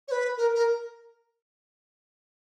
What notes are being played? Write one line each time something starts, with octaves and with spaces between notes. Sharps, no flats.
C#5
B4
A#4
A#4